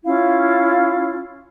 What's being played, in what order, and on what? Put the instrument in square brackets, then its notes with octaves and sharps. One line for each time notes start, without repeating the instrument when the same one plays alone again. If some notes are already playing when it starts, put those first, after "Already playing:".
[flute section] C#4 E4 F4 F5